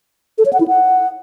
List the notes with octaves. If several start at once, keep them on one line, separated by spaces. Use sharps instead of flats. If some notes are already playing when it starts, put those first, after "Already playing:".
A4
C#5
F#5
E4
F#5